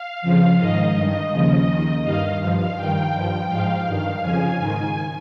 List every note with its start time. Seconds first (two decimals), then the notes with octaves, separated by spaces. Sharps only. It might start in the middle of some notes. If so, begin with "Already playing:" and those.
Already playing: F5
0.22 F2 C#3 F3
0.58 G#2 D#3 D#5
0.95 G2 D#3
1.31 D#2 C#3 F3
1.67 D#2 D#3
2.04 G2 D#3 F5
2.40 G2 F3
2.76 G2 D#3 G5
3.13 G2 F3
3.49 G#2 F3 F5
3.85 G2 D#3
4.21 F2 C#3 F3 G#5
4.58 G#2 D#3